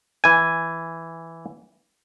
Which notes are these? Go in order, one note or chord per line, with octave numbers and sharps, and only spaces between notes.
E3 G#5